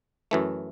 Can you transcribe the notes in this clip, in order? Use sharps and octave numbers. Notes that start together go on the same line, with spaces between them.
F#2 E3 A3